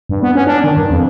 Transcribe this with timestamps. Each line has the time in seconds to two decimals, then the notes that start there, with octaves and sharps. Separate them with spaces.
0.09 G2
0.23 B3
0.35 C#4
0.47 D4
0.64 D#3
0.77 G2
0.90 F2